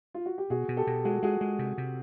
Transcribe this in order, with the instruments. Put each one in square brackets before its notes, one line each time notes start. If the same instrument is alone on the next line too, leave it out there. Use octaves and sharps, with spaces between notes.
[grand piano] F4
F#4
G4
[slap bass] B2 [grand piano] F#4 G#4
[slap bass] B2
[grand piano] G4 A4
[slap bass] B2
[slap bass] G#3 [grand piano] F#4 G#4
[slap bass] G#3 [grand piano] F#4 G#4
[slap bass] G#3
C3
C3